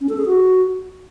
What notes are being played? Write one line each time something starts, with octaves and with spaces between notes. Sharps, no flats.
C#4
A4
G#4
F#4